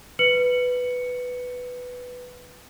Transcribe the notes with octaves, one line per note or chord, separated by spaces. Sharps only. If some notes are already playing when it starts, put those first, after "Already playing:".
B4 C#7 F#7